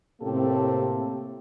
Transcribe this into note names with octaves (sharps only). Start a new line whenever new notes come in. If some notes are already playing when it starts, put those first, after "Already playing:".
A2 C3 A#3 C4 G4 A4